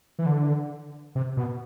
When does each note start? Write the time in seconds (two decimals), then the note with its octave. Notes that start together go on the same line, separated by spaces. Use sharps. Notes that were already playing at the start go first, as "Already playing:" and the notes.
0.19 E3
0.26 D3
1.15 C3
1.37 B2